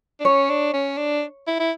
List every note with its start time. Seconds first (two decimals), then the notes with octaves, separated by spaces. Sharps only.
0.20 D4
0.25 C#4 C#5
0.49 D4
0.73 C#4
0.97 D4
1.47 E4
1.59 E4